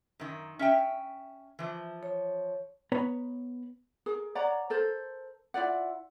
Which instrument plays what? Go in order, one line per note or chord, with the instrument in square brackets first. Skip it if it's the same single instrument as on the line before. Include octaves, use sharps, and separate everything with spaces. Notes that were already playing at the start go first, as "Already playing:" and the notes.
[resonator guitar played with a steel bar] F#2 D#3
C#4 E5 G5
E3 F3
[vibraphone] C#5
[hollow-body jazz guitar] B3 B4 C#5 A#5
[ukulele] G#4 A#4
C#5 D5 F#5 A#5
A4 A#4 C5
E4 F4 D5 F#5